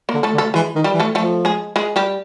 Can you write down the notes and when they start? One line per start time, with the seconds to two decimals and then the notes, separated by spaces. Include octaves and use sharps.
0.09 A#3 A#4
0.14 D3
0.23 A3 A4
0.34 D3
0.38 A3 A4
0.54 E3 G#3 G#4
0.75 D#3
0.84 G3 G4
0.94 E3
1.00 A3 A4
1.15 F3 A3 A4
1.45 G#3 G#4
1.76 G#3 G#4
1.96 G3 G4